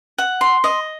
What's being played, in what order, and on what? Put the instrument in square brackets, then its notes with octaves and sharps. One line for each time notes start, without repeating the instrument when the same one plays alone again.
[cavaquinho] F#5
C6
D#5